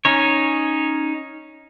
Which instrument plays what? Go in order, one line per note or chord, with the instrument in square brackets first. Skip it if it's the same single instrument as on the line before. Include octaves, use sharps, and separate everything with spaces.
[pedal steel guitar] C#4 D#4 C#5